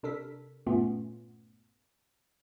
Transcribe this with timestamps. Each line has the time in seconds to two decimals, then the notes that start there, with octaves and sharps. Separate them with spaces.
0.03 C3 D4 A4 A#4 B6
0.66 G2 A#2 A3 B3 C#4 F4